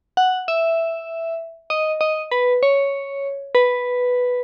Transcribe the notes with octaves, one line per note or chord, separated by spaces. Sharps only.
F#5
E5
D#5
D#5
B4
C#5
B4